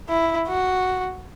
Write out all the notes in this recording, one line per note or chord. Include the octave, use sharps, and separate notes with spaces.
E4
F#4